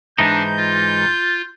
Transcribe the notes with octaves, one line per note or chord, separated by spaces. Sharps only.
G#2 E3 D4 D#4 G6
F4